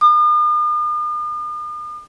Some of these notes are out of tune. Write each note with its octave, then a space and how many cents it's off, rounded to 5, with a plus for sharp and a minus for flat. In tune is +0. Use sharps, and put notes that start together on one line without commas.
D#6 -45